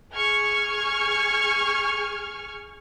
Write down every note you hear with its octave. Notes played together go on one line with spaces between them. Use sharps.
G#4 C#6 F6 G#6